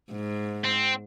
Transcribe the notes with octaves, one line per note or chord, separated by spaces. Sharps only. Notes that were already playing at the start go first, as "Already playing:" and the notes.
G#2
C4